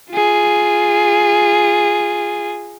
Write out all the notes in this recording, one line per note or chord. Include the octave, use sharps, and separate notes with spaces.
F4 G#4